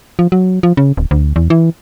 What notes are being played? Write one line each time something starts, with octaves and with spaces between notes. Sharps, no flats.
F3
F#3
F3
C#3
D1
D2
E2
E3